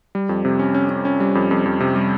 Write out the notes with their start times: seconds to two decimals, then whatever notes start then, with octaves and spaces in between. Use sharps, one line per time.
0.15 G3
0.29 F2
0.45 C3
0.59 C#4
0.74 C#4
0.89 C#4
1.05 C#4
1.20 G3
1.35 F2
1.51 F2
1.66 F2
1.80 C3
1.95 G3